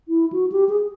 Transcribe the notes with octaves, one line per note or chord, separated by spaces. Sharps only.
E4
F#4
G4
G#4